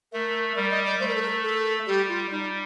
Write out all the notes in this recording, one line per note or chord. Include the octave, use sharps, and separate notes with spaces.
A3 A#4
G3 A#4
D#5
D5
A3 C5
A#4
A4
A#4
A4
G3 G4
F4
G3 D#4